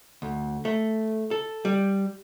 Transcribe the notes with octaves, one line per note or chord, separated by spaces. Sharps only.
D2
A3
A4
G3